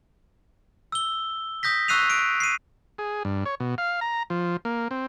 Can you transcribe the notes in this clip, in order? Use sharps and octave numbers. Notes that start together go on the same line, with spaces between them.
E6 G7
D#6 G6 A#6 B6
C#6 E6 F#6 C7 D#7 F7
D7
C7 D#7
G#4
G2
C#5
B2
F5
A#5
F3
A#3
C4